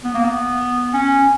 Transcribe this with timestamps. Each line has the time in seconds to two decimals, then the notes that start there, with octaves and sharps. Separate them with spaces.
0.04 B3
0.14 A#3
0.25 B3
0.94 C#4